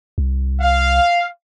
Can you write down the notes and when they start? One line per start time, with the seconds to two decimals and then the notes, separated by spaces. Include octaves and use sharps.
0.18 C2
0.61 F5